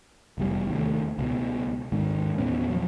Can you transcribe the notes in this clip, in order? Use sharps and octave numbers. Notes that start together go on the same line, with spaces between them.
F1 E2 G3
D#2 C3 A3
C#2 B2
G#1 D#2 G#2
E2 A#2 B3 C#4
F3 F#3